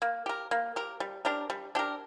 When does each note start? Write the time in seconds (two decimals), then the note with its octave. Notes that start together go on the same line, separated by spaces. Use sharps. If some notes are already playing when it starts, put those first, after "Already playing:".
0.02 A#3
0.26 G4 A#4
0.51 A#3
0.76 G4 A#4
1.00 G3
1.25 D4 G4 A#4
1.50 G3
1.75 D4 G4 A#4